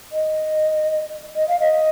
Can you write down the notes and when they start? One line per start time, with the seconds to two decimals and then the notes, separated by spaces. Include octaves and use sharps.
0.13 D#5
1.36 D#5
1.48 F5
1.60 D#5